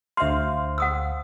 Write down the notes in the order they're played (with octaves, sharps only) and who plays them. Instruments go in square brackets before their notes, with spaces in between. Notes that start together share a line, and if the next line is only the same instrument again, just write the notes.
[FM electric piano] D2 C5 F5 [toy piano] E5 C6
[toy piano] F#5 D#6 E6